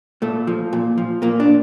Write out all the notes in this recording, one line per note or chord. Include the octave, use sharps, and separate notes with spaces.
A#2 A3
F3
A#2
F3
A#2 A#3
D4